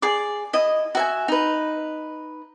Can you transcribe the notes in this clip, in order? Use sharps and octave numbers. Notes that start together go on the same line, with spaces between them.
G#4 D5 D6
E4 D#5
F#4 E5 G#5
D#4 B4